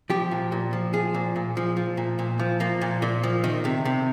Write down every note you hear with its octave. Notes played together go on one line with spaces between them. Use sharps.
F3 G4
A#2
A#2
F3
F3 G#4
A#2
A#2
F3
F3
A#2
A#2
F3
F3 A#3
A#2
A#2
F3
D#3
C3
C3